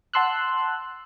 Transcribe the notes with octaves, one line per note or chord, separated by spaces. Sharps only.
F#5 A5 C6 E6 F#6